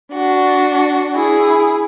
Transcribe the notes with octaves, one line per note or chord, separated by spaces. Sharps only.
D4 F#4
E4 G#4